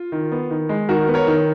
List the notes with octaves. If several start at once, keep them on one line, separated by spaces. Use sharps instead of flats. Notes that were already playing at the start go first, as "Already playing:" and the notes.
Already playing: F4
D#3
B3
D#3
G#3
D#3 F#4 A#4
B3
A#4 C#5
D#3